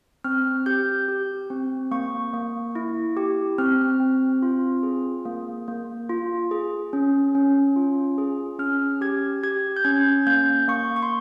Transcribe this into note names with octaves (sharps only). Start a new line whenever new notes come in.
C4 F6
G4 G6
G4
C4
A#3 C#6
A#3
E4
G4
C4 F6
C4
F4
G#4
A#3
A#3
F4
G#4
C#4
C#4
F4
G#4
C#4 F6
G4 G#6
G4 G#6
G6
C#4 G#6
A#3 G6
A#3 C#6
C#6
C6